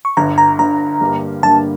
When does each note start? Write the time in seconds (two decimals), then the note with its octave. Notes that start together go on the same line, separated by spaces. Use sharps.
0.05 C#6
0.17 G1 G2 D3 A#5
0.38 A#5
0.59 G1 G2 D3 A#5
1.01 G1 G2 D3 G3 A#3
1.43 G1 G2 D3 G3 A#3 A5